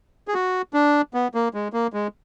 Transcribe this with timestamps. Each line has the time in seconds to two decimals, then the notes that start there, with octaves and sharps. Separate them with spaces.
0.28 G#4
0.34 F#4
0.74 D4
1.14 B3
1.35 A#3
1.54 G#3
1.73 A#3
1.93 G#3